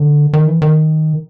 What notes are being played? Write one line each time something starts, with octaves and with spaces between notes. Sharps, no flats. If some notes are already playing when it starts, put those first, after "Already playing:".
Already playing: D3
D#3
E3
D#3